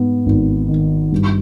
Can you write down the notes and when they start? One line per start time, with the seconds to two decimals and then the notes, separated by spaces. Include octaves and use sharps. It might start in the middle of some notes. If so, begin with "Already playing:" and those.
Already playing: G#2 B3
0.26 G#1
0.69 D#3
1.12 G2